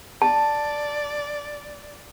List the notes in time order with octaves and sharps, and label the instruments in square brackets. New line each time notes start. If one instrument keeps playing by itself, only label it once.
[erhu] D5 [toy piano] A5